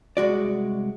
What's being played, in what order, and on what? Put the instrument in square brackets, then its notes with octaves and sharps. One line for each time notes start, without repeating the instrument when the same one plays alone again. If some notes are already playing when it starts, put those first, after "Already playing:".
[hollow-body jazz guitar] C2 G#3 F#4 D5